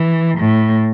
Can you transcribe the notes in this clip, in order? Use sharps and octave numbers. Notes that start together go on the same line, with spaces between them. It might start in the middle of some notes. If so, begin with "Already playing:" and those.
Already playing: E3
A2